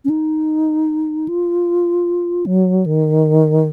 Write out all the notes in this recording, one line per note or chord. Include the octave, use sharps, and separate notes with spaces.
C#4
D#4
F4
F#3
D#3